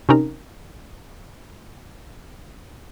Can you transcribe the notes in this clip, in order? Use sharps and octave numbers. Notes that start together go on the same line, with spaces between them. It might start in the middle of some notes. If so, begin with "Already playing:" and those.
C3 C#4 D#4 A#4